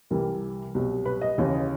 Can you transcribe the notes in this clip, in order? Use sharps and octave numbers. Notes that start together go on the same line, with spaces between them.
C2 C3 E3 G3 A#4
C2 B2 F#3
B4
D#5
D#2 C#3 E3